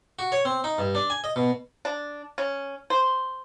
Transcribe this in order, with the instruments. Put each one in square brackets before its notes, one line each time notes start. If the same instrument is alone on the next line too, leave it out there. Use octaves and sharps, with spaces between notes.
[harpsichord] F#4
C#5
C4
D#4
G2
D4
G#5
D#5
B2
[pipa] D4
C#4
C5